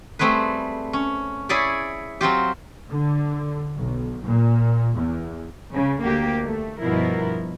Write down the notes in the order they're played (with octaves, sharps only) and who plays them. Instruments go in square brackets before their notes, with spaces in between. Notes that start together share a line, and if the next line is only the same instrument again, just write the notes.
[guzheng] G3 A3 C4 G#4 B4
C#4
E4 G#4 C#5 D5 G#5 B5
F#3 C4 F4 G4
[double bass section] D3
B1
A#2
E2
[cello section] C#3
D2 A#3 G4
A3
G2 B2 F3 E4 A#4